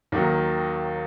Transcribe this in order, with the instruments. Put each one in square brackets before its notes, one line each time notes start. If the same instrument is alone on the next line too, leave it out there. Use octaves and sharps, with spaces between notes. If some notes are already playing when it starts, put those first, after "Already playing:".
[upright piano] D#2 D#3 F#3